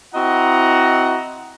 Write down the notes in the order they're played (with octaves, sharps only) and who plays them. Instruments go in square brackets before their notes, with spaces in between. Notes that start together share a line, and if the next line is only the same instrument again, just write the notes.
[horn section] C4 E4 F#4 D#5 F#5 A#5